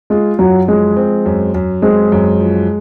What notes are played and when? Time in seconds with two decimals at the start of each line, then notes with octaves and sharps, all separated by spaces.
0.10 G#3 F4
0.39 F#2 F#3
0.68 F3 G#3
0.97 C4
1.26 F#2
1.55 F#2
1.82 G#3 C4
2.12 F#2
2.40 F3